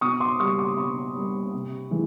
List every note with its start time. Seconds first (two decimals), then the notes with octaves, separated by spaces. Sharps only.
0.01 B2 C#6 D#6
0.20 C6 D6
0.39 G3 A#3 C#6 D#6
0.58 C6 D6
0.77 B2 B5 C#6
1.16 G3 A#3
1.54 C3
1.91 E3 G#3